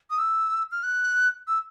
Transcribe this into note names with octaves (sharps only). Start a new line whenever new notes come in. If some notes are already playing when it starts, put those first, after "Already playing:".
D#6
E6
F6
F#6
E6